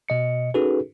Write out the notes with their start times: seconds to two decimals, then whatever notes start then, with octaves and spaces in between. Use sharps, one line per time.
0.09 B2 D#5 C#7
0.54 C#4 D#4 F#4 G#4 A4 B4